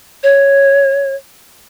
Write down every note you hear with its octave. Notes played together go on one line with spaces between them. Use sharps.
C#5